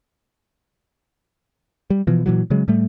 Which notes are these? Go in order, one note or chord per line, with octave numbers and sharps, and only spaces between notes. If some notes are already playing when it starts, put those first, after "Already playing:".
G3
B2 E3 F3
A#2 E3 F#3
C#3 F#3 G#3
A2 G3 A3